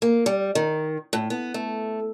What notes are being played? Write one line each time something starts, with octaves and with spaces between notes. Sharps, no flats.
A#3
G3
D#3
A2
B3
A3